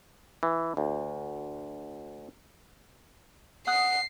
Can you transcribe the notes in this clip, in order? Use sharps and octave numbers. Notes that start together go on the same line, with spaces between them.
E3
D2
F#5 D#6 F#6 C7